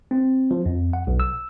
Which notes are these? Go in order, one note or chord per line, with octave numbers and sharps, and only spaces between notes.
C4
F3
F2
F#5
B1
E6